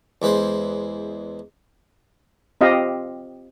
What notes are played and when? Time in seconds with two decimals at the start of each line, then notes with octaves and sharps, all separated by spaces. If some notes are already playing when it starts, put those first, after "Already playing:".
0.22 E2 G#3 B4 C5 C6
2.61 C4 F4 G4 D#5 F5